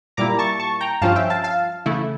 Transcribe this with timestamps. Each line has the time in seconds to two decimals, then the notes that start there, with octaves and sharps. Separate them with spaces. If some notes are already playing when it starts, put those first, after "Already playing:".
0.17 A#2 G3 A#3 E4 A#5 D6
0.39 A5 C#6
0.60 A5 C#6
0.81 G5 A#5
1.02 G2 F3 C#4 F4 F5 A5
1.16 E5 G5
1.30 F5 A5
1.44 F5 A5
1.86 C#3 E3 A3 E4